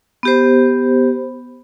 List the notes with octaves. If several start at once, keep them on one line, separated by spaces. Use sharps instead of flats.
B3 G4 C5